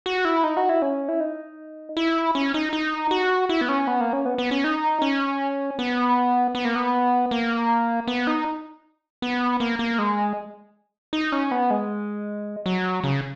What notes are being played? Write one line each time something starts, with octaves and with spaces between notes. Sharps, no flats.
F#4
E4
D#4
F#4
E4
C#4
E4
D#4
E4
C#4
D#4
D#4
F#4
E4
B3
C#4
B3
A#3
C#4
B3
B3
C#4
D#4
C#4
B3
B3
A#3
B3
A#3
B3
D#4
B3
A#3
A#3
G#3
D#4
C#4
B3
G#3
F#3
C#3